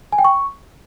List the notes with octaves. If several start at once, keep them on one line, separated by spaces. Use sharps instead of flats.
G#5
G5
C#6